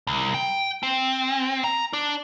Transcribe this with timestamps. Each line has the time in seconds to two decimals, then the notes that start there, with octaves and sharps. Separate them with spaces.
0.07 C2
0.34 G5
0.83 C4
1.64 A#5
1.93 D4